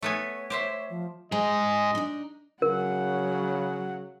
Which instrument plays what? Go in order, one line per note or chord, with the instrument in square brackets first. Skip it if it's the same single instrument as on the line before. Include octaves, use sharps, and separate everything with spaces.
[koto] A3 B3 G#5 [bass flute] C#5
[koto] G4 C5 E5
[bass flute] F3
[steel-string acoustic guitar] G#3 [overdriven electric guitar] D#4 G#4 [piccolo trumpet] D#5
[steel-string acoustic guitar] D4 D#4
[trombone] C#3 [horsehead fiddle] F#3 F#5 [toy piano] A#4